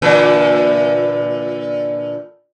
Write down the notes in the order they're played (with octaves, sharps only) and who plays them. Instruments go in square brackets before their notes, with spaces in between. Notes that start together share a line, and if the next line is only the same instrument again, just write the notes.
[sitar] A#2 D3 E3